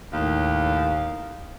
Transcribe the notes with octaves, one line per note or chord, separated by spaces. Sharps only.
D#2 A2 F5